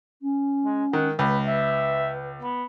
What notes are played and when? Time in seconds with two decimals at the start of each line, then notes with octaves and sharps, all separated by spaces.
0.22 C#4
0.65 G#3
0.93 D#3 F#5
1.19 C#2 B4
1.46 B4 E5
2.42 B3